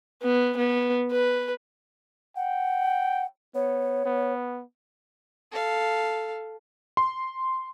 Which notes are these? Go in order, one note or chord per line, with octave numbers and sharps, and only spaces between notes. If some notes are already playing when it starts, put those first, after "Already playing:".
B3
B3
B4
F#5 G5
B3 C#5
B3
A4 F5
C6